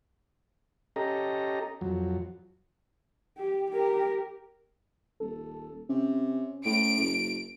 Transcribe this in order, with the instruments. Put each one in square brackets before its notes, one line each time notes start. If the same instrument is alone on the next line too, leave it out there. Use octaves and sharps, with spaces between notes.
[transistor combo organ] C#4 G4 A4 D#5 A#5
F2 F#3
[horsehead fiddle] G4
G4 A#4
[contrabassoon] D#1 [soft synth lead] A4
[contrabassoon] C3 [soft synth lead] C#4
[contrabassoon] A2 [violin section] D7
[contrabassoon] F#1